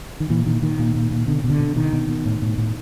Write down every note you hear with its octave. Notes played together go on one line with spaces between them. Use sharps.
D#3
A#2 E3
A#2 D#3
A#2 D#3
A#2
A#2
A#2
B2 D3
B2
D3
B2
B2 D#3
B2
B2
A2
A2
A2